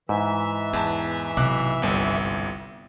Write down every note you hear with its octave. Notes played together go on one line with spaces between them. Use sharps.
G#2 E3 E5
E2 B3 A5
B1 C3 D6 F#6
G1 C2